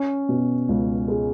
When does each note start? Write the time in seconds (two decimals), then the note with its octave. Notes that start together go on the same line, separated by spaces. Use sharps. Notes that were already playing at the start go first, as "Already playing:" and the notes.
Already playing: C#4
0.29 B2
0.69 C#2
1.08 G#3